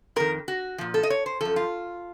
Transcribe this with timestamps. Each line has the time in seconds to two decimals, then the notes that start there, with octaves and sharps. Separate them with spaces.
0.16 F2 D#3 A#4
0.48 F#4
0.78 A#2 F3
0.94 A4
1.03 D#5
1.10 C#5
1.26 C5
1.41 F#2 F3 A4
1.56 F4